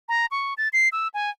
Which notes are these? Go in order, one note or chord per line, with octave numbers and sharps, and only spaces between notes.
A#5
C#6
A6
C7
E6
G#5